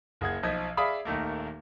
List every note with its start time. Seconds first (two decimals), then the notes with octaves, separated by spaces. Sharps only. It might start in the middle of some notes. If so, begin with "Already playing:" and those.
0.21 F#1 G#4 F#5 G#6
0.43 B1 F3 D#5 G#6 B6
0.77 G#4 D5 E5 F5 B5 D#6
1.05 D#1 D#3 A3 A#3